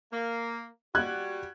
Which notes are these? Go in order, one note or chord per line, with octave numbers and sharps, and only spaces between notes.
A#3
G3 F#4 F#6 G#6